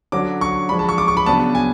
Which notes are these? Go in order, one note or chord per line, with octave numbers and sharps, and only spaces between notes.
D3 F#3 C#4 D6
C#6
F3 G#3 D4 B5
A5
C#6
D6
C#6
B5
C#3 F#3 B3 D4 A5
G#5